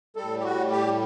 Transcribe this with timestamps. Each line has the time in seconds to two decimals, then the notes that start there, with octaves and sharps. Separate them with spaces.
0.16 A2 G3 A4
0.39 G4
0.43 F#4
0.71 G4